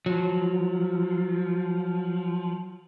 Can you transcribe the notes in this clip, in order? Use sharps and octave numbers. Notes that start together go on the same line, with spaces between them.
F3 F#3